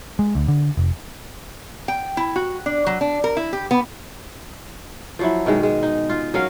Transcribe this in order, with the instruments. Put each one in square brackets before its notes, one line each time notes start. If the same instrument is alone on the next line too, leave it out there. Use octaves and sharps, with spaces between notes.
[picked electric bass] G#3
D2
D3
F1
[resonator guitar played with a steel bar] G5
E4
F#4
D4
F#3
D4
A#4
E4
G4
B3
[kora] F3 F#3 E4
B2 D#3 G#3
G#3
D#4
F4
F#3 C#4 A#4 F5